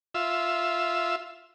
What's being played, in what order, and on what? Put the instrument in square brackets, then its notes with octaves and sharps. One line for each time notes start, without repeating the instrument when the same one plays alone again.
[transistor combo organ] F4 E5